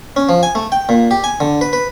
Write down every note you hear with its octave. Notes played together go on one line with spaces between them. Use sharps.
C#4
F3
G#5
A3
G5
A#2
G4
G#5
D3
B4
B4